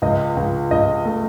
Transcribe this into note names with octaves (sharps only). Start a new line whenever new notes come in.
C#2 D#5
C#2
C#2 D#5
A3